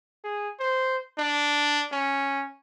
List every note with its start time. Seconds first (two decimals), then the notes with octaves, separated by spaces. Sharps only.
0.24 G#4
0.60 C5
1.18 D4
1.92 C#4